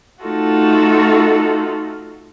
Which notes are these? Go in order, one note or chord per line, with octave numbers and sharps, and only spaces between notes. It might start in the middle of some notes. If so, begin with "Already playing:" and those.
A3 D#4 F4 F#4 A4